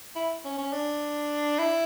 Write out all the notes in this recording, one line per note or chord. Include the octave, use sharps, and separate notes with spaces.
E4
C#4
C#4
D4
E4